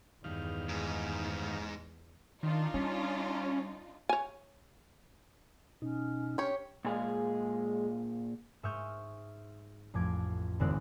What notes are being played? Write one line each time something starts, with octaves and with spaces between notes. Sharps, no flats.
E2 G2 D#3 F5
G#2
D#3 D4 D#4 F4
G3 C#4
C#5 G#5
B2 C#4 D#4
D4 G4 C#5
A#2 G#3 G#4 F5
G#2 E5 C#6 D#6 F6 G6
A1 F2 D6 G#6
G#1 D#2 G#2 C4 D5 F#6